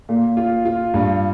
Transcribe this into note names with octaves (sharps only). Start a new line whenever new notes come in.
A#2
F4
F4
G2